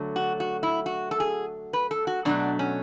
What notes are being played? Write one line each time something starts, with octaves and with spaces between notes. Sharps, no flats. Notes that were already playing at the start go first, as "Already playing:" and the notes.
Already playing: D3 F#3 A3
F#4
F#4
E4
F#4
A4
G#4
B4
A4
F#4
B2 F#3 A3 D4
C#4